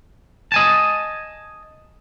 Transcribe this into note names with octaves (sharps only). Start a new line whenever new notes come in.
D#5 G#5 A5